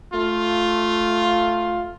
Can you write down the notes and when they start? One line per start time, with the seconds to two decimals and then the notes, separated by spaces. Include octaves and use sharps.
0.13 A3 F4